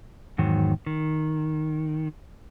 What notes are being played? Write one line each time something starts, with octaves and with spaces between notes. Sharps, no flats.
E2 G#2 D#3 F#3
D#3